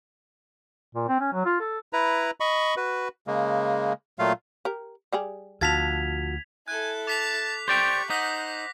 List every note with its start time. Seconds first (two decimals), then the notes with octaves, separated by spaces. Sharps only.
0.95 A#2
1.08 C4
1.20 C#4
1.33 F#3
1.46 F4
1.60 A4
1.93 E4 B4 A#5
2.40 D#5 B5 C#6
2.77 F#4 B4
3.27 C#3 G#3 A#3
4.19 A#2 F#3 A3 F4 F5
4.65 G4 A#4
5.13 G3 G4 G#4
5.61 D2 F3 F#4 A5 G#6 B6 F7
6.68 E4 A4 G#5 F#6
7.07 A5 D6 B6 F7
7.68 G4 C5 D5 G5 C#6
8.10 D#4 C5 F#5 D6 A#6 B6